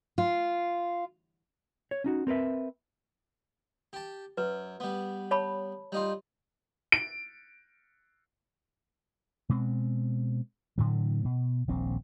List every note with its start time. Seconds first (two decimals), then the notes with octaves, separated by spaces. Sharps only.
0.18 F4
1.91 C#5
2.04 C#4 D#4 F#4
2.27 C4 A#4 B4 E5
3.93 G4 A5
4.38 F#2 B4
4.80 G3 B3
5.31 C#5 A5 B5
5.92 G3 D#4 F4
6.92 D7
9.49 B2 G#3 C4
10.78 A2 D3 E3 F#3
11.25 B2
11.68 D#1 A#1 C4